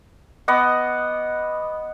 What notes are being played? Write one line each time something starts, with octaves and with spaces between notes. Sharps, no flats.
B3 D#5 F#5 D6